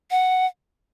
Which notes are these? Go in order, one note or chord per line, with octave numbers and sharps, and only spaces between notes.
F#5